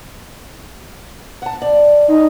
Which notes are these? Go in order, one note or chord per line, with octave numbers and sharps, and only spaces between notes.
F#5 A5
D5
D#4